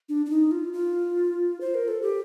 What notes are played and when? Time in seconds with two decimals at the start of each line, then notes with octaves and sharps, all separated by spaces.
0.09 D4
0.26 D4
0.30 D#4
0.51 F4
0.73 F4
1.61 C5
1.75 A#4
1.88 A4
2.02 G4